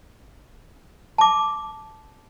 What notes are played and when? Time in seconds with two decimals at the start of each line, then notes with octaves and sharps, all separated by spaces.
1.18 A5 D6